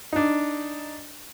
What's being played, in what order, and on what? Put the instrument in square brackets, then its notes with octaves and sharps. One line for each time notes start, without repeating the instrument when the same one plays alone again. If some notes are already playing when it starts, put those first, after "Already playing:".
[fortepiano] D4 D#4